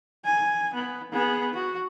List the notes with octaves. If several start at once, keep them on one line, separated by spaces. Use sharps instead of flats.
G#5
B3
B3 G#4
F#4